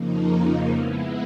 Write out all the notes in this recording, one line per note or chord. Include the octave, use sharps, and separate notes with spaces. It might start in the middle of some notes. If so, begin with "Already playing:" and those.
Already playing: F2 C#3 F3 A#3 D#4
G#3 B3 E4